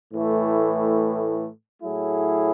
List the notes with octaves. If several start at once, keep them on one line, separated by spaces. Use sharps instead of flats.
A2 E3 A3
A2 F#3 A3 E4 G#4